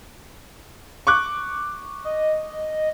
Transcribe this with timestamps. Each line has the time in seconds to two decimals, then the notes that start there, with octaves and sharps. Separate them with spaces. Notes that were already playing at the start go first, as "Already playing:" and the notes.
1.07 C#6 D6 F#6
2.05 D#5